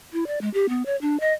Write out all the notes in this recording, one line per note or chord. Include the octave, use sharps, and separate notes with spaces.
E4
D5
G#3
G4
B3
C#5
D4
D#5